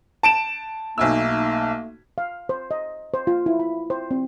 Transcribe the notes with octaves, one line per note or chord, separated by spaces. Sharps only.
A5 D7 E7
B1 A3 A#3 D#4 G#5 E6
F5
C5
D#5
C5
F4
E4
B5
C5
C4